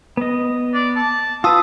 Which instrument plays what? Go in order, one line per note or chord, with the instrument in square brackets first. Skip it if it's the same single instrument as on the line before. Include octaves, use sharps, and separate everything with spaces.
[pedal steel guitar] B3 D#5
[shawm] D5
A5
[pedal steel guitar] F4 B4 [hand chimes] A5 D#6 E6